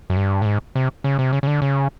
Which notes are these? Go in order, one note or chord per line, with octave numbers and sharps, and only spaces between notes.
F#2
G2
A2
G#2
C3
C#3
C3
C#3
C#3
D3
C#3